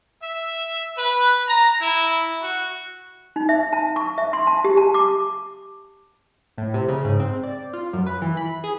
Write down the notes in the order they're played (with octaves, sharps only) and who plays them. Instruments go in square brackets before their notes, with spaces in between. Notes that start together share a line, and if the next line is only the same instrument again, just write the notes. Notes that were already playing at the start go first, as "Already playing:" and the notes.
[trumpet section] E5
B4
A#5
E4
F#4
[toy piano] D#4
E5
A5
C#6
E5
C6
A5
G4
A5
D6
[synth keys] A2
C3
C#3
G#2
C4
D5
F4
F#2
B4
E3
B5
G#4